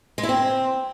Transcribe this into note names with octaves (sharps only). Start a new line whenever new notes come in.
G#3
E4
C4